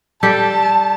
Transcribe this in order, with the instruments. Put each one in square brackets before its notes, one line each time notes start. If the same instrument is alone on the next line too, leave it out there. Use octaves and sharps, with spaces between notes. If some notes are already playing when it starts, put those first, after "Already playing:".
[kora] G3 G4 A4 [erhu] A5